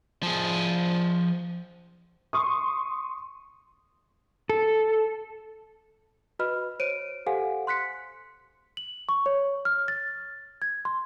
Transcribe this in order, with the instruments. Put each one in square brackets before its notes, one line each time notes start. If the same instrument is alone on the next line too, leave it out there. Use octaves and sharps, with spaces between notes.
[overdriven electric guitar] F3 G#4
[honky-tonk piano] C6 C#6 D#6
[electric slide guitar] A4
[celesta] F#4 B4 D#5 B5 F6
C5 C#5 D7 D#7
G4 A4 C5 F5 F#5 G#5
C6 F#6 B6 C#7
F#7
C#6
C#5
F6
A6
G#6
C6